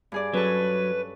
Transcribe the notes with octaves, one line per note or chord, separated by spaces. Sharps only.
G2 G#4 D5
F#3 C#4 A4 B4